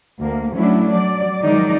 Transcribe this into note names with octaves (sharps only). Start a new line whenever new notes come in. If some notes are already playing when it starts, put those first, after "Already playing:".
D2 A#3
F#3 A3 C#4 D4 E4
F#3 D5
D#3 F3 F#3 G#3 D#4 D5